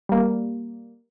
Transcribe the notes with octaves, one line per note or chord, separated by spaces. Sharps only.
G3 A#3